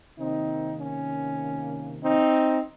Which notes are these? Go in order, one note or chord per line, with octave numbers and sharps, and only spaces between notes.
C3 D#3 A#3 C4 D#4
C#4
C4 D#4